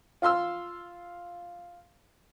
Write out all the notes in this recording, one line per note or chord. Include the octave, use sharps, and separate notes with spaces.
F4 F5 C6 E6